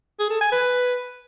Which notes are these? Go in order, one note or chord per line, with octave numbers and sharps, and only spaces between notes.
G#4
A4
G#5
B4